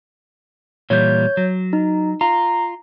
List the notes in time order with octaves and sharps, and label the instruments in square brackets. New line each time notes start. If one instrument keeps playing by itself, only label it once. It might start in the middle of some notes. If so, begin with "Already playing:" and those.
[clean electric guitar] A#2 E3 G3 [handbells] C#5 G6
[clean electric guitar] F#3
[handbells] D#4
[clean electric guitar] F4 [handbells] A#5